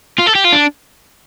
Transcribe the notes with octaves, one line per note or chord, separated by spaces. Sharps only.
F4
A4
G4
F4
D4